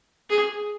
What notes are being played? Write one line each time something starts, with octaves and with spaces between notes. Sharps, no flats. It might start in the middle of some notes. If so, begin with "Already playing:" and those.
G#4